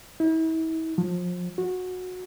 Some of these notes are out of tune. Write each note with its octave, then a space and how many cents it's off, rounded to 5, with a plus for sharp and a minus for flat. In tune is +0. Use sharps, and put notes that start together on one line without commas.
E4 -40
F3 +30
F#4 -20